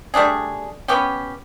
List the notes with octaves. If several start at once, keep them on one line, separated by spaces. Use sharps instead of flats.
G3 A3 D4 G#4
B3 C#4 G4